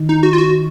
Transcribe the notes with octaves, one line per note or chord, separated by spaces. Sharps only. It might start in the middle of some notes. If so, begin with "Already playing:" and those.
Already playing: D#3
D#4
F#4
F4
F#4